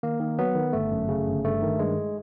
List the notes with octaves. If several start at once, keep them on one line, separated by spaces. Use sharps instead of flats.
D#3 A#3
D#3
F#3 B3
D#3
G1 A3
F#2
C#3
G1
G2 A3
D#3
G2 G#3